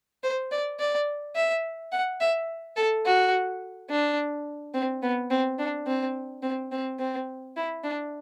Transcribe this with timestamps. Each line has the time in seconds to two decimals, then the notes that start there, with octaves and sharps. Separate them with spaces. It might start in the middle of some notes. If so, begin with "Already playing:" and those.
0.23 C5
0.52 D5
0.80 D5
1.35 E5
1.92 F#5
2.21 E5
2.76 A4
3.06 F#4
3.90 D4
4.74 C4
5.03 B3
5.31 C4
5.59 D4
5.87 C4
6.43 C4
6.72 C4
6.99 C4
7.57 E4
7.84 D4